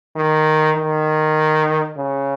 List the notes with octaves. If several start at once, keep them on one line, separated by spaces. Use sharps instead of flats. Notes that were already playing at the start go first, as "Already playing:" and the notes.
D#3
D#3
C#3